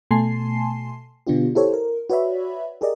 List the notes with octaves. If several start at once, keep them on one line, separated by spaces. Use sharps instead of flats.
B2 A3 G#5 A5 C6 C7
B2 D3 B3 D4 F4 G4
E4 G4 A4 C5 C#5
A#4
F#4 B4 C#5 D5 E5 B5
G4 G#4 A#4 D5 D#5